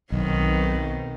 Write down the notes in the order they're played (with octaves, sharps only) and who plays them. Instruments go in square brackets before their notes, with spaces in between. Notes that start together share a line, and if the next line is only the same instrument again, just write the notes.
[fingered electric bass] B1 [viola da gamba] B2 D#3 C4